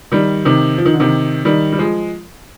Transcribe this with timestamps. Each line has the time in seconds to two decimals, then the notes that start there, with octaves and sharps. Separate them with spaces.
0.12 D#3 G3
0.45 C3 D#3
0.78 F3
0.85 D#3
0.94 D3
1.00 C3 D#3
1.45 D#3 G3
1.72 G3
1.78 F3 G#3